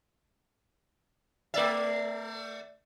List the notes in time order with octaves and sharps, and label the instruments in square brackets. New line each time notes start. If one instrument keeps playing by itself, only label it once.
[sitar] A3 D5 E5